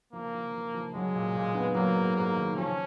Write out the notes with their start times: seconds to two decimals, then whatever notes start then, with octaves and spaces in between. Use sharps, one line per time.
0.13 F3 A#3
0.34 F3
0.54 F3
0.74 F3
0.94 F#3 G#3
1.15 A#2
1.34 A#2
1.55 B3
1.75 F#3 A#3
1.95 G#2
2.16 G#2 A#3
2.36 D#3
2.56 F3 C#4